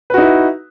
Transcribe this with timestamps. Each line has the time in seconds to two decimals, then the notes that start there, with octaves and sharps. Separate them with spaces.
0.10 B4
0.14 F#4
0.18 D#4
0.21 E4